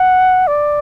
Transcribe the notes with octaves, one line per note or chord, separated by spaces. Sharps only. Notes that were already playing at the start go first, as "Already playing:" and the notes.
Already playing: F#5
D5